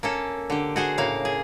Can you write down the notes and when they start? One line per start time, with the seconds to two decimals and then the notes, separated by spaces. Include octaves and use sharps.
0.03 A#3 C#4 A4
0.50 D3 G4
0.76 F#4 G#4 C5
0.98 A2 C#3 A#3 F5
1.25 G#4